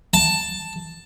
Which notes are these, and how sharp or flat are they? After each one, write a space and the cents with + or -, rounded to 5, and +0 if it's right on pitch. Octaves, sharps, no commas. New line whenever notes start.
A5 +5